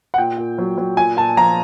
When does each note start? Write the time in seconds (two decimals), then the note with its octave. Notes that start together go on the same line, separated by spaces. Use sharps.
0.14 F#5
0.18 A#2 G5
0.38 A#2
0.58 F#3
0.78 F#3
0.97 A#2 G#5
1.17 A#2 A5
1.37 F3 A#5